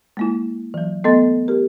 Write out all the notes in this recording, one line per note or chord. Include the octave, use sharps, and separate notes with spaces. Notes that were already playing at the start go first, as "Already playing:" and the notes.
G#3 A#3 E4
E3 F#3
A3 B3 A4 D#5 C6 A6
G4 A#4